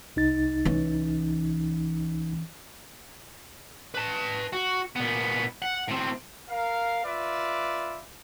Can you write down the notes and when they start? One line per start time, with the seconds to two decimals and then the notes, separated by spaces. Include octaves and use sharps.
0.16 C2 D#4 A6
0.65 E3 C#4
3.94 B4 A5
4.53 F#4
4.96 A#2 B3
5.62 F#5
5.88 A2 C4
6.50 A#4 F5
7.05 F4 B4 D5 E5